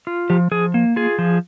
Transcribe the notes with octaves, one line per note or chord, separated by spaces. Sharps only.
F4
F3 G4
F3 G#4
A#3
F4 G#4
F3